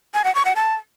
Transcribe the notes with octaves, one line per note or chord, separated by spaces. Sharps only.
G#5
F#5
C#6
F#5
A5